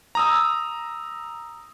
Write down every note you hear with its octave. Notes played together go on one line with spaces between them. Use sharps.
A#5 D#6 E6